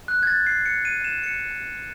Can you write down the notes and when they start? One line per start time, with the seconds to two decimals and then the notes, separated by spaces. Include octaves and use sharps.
0.08 F#6
0.23 G#6
0.27 A6
0.47 C7
0.66 C#7
0.85 D#7
1.04 E7
1.24 C#7